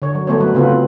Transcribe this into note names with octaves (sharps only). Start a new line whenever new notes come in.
D3 C#5
F#3
F#3 A3 B3 C5 C#5
F#3 B3 D4 B4
C#3 B3 C4 F4 A4 B4
A3